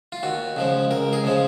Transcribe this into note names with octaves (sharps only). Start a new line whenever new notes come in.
F4
D#2 F#4
C#3 F3 G#3
C#2 A#4
G#4
C#3 F3 G#3